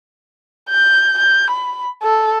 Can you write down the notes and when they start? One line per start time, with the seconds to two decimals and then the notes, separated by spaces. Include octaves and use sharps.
0.69 G6
1.18 G6
1.50 B5
2.02 A4